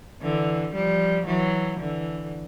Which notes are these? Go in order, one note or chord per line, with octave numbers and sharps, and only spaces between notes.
D3 E3
F3 G3
E3 F#3
D3 E3